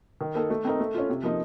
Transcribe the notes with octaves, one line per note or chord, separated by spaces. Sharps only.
D#3
A#3 D#4 A4
A3
C4 D#4 A#4
A3
C#4 F4
C3
F3 A#3 D#4